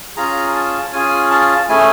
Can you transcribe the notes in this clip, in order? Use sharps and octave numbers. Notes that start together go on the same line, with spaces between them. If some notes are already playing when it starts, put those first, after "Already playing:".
C#4 F4 G#4 A#5
A5
C#4 F4 G#4 G#5
A5
A3 C#4 E4 G#4 G#5